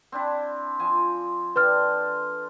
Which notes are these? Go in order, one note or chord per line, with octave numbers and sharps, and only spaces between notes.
C4 D4 E4
F3 C5 G#5
D4 A4 B4 G5 C6 F6